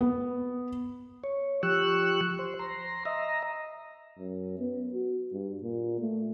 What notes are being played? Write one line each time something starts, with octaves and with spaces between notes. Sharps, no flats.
B3
C#5
F3 G4 C#6 E6 F#6
C5
A#5 C6
D#5 E5 A#5
F#2
B3
F#4
G2
A#2
A3